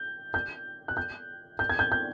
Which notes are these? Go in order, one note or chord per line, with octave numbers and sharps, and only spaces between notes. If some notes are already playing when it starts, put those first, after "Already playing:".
Already playing: G6
G6
F#6
G6
G6
G#6
G6
G6